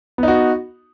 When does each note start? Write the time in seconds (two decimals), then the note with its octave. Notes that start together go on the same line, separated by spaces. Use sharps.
0.18 B3
0.23 D#4
0.28 F#4